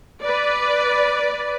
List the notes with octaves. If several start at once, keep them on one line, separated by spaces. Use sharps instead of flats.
B4 D5